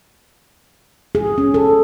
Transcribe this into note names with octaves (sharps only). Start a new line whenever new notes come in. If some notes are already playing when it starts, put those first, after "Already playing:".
G#4
C#4
A4